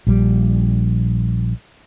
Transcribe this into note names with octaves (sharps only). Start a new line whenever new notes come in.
A#1 G3